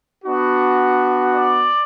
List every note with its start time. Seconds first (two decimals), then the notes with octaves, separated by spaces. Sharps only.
0.23 B3 D4 F#4
1.34 D5